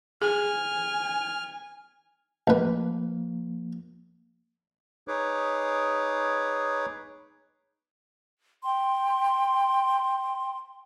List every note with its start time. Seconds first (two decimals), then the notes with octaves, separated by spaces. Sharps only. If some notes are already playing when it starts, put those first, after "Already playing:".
0.22 G#4 G#5 F6
2.47 A1 F3 A#3 B4
5.08 D#4 G#4 B4 C#5 D6
8.64 G5 C6